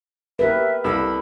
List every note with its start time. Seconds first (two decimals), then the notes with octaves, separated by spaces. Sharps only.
0.39 G4 A#4 B4 E5
0.84 C2 A4 B5 E6